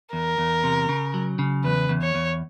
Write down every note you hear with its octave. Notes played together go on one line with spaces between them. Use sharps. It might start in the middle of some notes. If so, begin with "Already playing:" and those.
E2 A#4
E2
C3
C#3
F#3
C#3
E2 B4
E2
C#5
E2